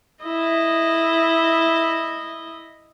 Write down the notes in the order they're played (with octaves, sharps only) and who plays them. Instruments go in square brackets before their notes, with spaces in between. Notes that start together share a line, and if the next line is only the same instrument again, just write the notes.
[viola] E4 D#5